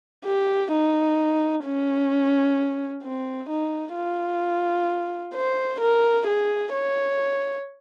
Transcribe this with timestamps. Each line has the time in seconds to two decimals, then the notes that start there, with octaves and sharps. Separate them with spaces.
0.25 G4
0.72 D#4
1.64 C#4
3.03 C4
3.49 D#4
3.95 F4
5.34 C5
5.80 A#4
6.27 G#4
6.73 C#5